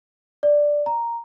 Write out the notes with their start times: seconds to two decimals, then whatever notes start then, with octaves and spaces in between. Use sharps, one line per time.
0.43 D5
0.86 A#5